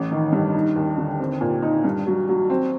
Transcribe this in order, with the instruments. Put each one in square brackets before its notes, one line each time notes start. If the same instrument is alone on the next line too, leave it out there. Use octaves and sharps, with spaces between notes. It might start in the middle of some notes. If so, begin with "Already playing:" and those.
Already playing: [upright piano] A1
D#3
G2
D#4
D#2
D3
C4
A#2
D#4
G2
F#3
F#3
C4